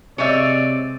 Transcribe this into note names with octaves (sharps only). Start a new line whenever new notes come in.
C3 G#3 C4 C#5 D5 E5